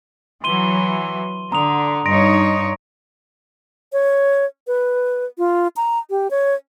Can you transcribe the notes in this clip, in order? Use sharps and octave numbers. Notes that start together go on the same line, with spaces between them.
E3 F#3 C6 D#7 G7
D3 A#5 D#6 F7
G2 D#4 C#5 C6 A#6 D7
C#5
B4
F4
A#5
G4
C#5